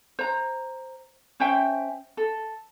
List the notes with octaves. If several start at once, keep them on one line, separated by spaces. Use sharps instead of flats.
C5 A#5
C#4 C5 E5 G5
A4